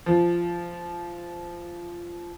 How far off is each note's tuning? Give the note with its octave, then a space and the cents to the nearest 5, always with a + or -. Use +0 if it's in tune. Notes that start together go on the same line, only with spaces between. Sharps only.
F3 -15